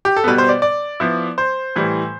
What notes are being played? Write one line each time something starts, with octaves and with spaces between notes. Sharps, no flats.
G4
A4
B2 G3 B3 B4
C5
D5
D5
F3 B3 E4
C5
A2 E3 G3